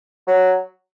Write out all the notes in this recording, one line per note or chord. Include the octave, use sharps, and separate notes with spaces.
F#3